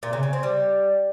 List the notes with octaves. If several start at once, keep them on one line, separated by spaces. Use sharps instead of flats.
A#2
C#3
C#3
C4
G3